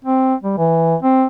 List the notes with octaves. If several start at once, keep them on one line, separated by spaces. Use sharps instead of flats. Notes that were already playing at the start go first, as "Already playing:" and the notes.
C4
G3
E3
C4